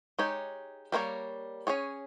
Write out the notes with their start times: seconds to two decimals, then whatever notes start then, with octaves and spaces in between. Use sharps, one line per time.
0.19 G#3 D#4 G4 C#5
0.92 G3 A#3 F4 A#4 C#5
1.67 C#4 G#4 C#5